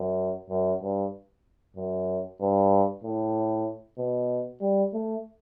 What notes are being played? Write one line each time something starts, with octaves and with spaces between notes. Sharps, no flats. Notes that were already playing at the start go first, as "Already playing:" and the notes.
Already playing: F#2
F#2
G2
F#2
G2
A2
B2
G3
A3